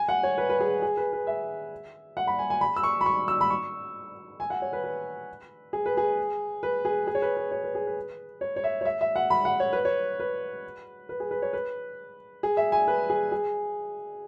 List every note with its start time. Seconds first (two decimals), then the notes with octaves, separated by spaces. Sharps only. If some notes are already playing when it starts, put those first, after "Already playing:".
Already playing: G#5
0.09 F#5
0.23 C#5
0.38 B4
0.49 B4
0.60 G#4
0.82 G#4
0.97 B4
1.13 B4
1.27 E5
2.17 F#5
2.27 B5
2.39 G#5
2.50 G#5
2.61 B5
2.76 E6
2.83 C#6
3.01 B5
3.06 C#6
3.28 E6
3.41 B5
3.50 C#6
4.40 G#5
4.50 F#5
4.62 C#5
4.73 B4
4.84 B4
5.73 G#4
5.86 B4
5.97 G#4
6.63 B4
6.85 G#4
7.07 G#4
7.15 C#5
7.22 B4
7.37 B4
7.51 C#5
7.64 B4
7.75 G#4
7.87 B4
8.41 C#5
8.56 C#5
8.64 E5
8.81 C#5
8.85 E5
9.01 E5
9.16 F#5
9.30 B5
9.45 F#5
9.60 C#5
9.73 B4
9.85 C#5
10.20 B4
11.09 B4
11.20 G#4
11.31 B4
11.42 C#5
11.53 B4
12.43 G#4
12.57 E5
12.72 G#5
12.88 B4
13.10 G#4
13.32 G#4